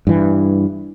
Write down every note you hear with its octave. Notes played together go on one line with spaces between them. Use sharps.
G2 E3